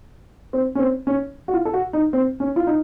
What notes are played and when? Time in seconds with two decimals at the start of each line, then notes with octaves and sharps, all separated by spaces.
0.53 C4
0.75 C#4
0.79 C4
1.07 C#4
1.48 F#4
1.54 F4
1.65 A4
1.73 F#4
1.93 D#4
2.13 C4
2.40 C#4
2.56 F4
2.67 D#4